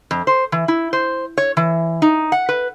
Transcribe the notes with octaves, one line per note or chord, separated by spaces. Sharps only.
F2
C5
E3
E4
C5
C#5
E3
D#4
F#5
B4